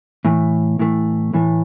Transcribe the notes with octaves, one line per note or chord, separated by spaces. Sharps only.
A2 E3 A3
A2 E3 A3
A2 E3 A3